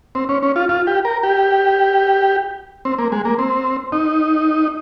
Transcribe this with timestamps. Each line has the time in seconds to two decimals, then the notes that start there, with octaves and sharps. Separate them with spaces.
0.15 C4
0.29 C#4
0.43 C#4
0.56 F4
0.69 F4
0.87 G4
1.05 A#4
1.23 G4
2.85 C4
2.98 A#3
3.12 G#3
3.25 A#3
3.39 C4
3.92 D#4